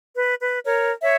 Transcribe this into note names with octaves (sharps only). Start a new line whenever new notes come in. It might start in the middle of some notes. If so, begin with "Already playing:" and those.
B4
B4
A#4 C#5
C#5 E5